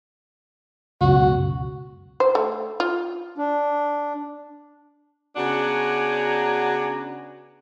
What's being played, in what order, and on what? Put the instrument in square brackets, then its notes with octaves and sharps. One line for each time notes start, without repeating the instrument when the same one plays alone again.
[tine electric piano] C#2 F#2 B2 [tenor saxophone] F#4
[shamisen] C5
A3
F4
[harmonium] D4
[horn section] C#3 B3 D4 F#4 G#5 A#5